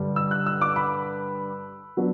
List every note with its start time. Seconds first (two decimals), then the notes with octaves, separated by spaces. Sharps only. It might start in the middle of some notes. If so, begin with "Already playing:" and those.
Already playing: G2 D3 G3 D4
0.16 E6
0.31 F#6
0.46 E6
0.61 D6
0.76 B5
1.97 F#3 B3 D4